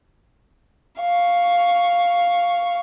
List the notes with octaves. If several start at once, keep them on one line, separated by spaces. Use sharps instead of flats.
F5 C#6